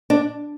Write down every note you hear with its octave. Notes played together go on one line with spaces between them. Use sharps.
D4